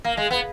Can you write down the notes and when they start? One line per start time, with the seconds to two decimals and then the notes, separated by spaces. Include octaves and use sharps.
0.04 A#3
0.17 G#3
0.31 B3